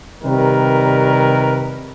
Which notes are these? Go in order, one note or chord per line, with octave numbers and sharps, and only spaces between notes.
C3 D#3 G3 A#4 B4